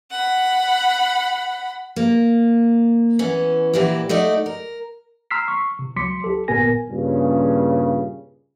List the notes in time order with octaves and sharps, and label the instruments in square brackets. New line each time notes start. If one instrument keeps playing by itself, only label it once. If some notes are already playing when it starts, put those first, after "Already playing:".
[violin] F#5 B5
[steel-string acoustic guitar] A#3
E3 B3 C#4
A#2 E3 E4 F#4 G4
A3 D#4 F#4 D5
A#4
[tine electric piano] A#5 C6 E6 F6 B6 C7
C#6
C3
C#2 F#3 C6 D6 B6 C#7
G4 A4
G1 A#2 B3 A#4 G#5 A#6
[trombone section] G2 A#2 C#3